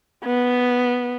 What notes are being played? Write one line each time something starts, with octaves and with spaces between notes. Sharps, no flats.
B3